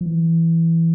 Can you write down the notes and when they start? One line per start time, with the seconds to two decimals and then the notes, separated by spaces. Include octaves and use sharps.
0.01 F3
0.06 E3